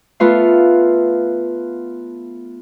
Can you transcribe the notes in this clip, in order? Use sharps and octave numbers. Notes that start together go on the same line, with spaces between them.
A3 B3 F4 F5